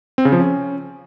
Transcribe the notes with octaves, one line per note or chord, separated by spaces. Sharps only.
C4
C#3
F3
C#4